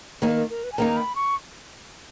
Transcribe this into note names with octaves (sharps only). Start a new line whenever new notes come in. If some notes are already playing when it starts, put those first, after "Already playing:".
D#3 A#3 D#4 A#4
A#4
A#4
B4
G#5
D#3 A#3 D#4 A#5
B5
C#6